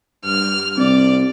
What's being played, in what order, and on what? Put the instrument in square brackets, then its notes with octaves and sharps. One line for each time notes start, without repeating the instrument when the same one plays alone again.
[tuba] G2 [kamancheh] F6
[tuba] C2 [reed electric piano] C4 [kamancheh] D5